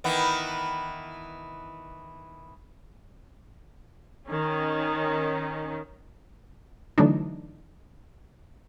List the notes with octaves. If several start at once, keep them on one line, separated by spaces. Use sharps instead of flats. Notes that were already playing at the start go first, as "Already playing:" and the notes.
D#3 E3 B3
D#3 C#4
D3 E3 F#3 A3 D4 D#4